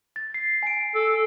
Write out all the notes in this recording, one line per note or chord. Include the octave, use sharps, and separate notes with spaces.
A6
C7
G#5 D7
A4